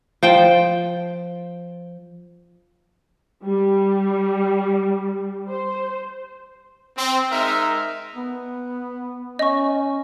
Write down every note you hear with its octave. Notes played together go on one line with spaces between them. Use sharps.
F3 C5 G5
G3
C5
C4
G#3 D#4 A#4 E5
B3
C#4 D#5 C#6